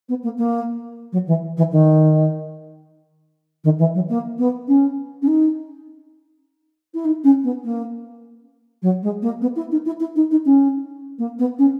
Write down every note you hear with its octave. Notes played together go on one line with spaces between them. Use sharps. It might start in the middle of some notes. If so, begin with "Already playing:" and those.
B3
A#3
A#3
F#3
E3
E3
D#3
D#3
E3
F#3
A#3
B3
C#4
C#4
D#4
E4
D#4
C#4
B3
A#3
F#3
G#3
A#3
B3
E4
D#4
E4
E4
D#4
D#4
C#4
A#3
B3
C#4